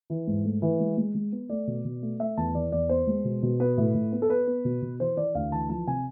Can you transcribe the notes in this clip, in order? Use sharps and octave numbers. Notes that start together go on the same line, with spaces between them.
E3
G#2
A3
E3
G#3
G#3
G#3
B3
A3 D5
B2
B2
A3
A3 E5
E2 A5
E3 D5
E2 D5
B3 C5
G#3
B2
B2
B3 B4
A2
A2
B3
A4
B3 B4
B3
B2
B2
E3 C5
E3 D5
D2 F5
E3 A5
F3 A5
C3 G#5